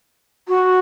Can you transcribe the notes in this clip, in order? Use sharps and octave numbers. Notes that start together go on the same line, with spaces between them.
F#4